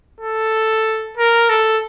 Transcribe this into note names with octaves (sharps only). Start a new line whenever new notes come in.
A4
A#4
A4